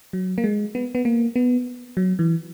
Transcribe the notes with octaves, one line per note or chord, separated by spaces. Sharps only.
F#3
A#3
G#3
B3
B3
A#3
B3
F#3
E3